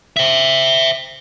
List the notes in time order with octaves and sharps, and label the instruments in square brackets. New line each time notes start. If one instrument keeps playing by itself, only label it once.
[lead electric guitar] C5 E5